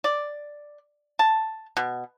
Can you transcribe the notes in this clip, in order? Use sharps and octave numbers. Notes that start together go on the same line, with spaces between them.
D5
A5
B2